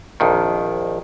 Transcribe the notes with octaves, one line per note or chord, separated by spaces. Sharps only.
A#1 F2 D#3